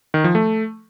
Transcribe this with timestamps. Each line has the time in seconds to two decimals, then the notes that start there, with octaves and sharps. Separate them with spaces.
0.14 D#3
0.24 F3
0.35 A3